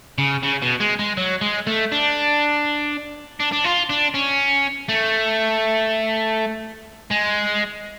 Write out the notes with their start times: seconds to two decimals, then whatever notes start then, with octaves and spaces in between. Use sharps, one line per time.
0.18 C#3
0.43 C#3
0.62 B2
0.80 G#3
0.99 G#3
1.17 F#3
1.41 G#3
1.67 A3
1.92 D4
3.40 D4
3.53 D4
3.65 F4
3.90 D4
4.15 C#4
4.89 A3
7.11 G#3